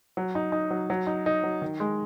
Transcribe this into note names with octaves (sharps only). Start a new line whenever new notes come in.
F#3
D#4
D#4
F#3
F#3
D#4
D#4
F#3
D#3
G#3